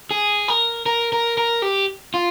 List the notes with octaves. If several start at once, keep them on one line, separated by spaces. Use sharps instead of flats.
G#4
A#4
A#4
A#4
A#4
G4
F4